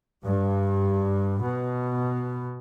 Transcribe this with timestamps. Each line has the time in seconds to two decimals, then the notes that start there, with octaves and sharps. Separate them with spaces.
0.23 G2
1.42 B2